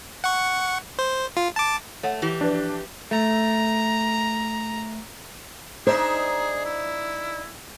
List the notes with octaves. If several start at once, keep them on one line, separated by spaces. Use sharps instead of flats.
F#5 C#6
C5
F4
A5 D6
A3 C#5 F#5
E3 G4
F3 D4 B4
G4
A3 A#5
D4 D#4 G#4 C5 E5
E4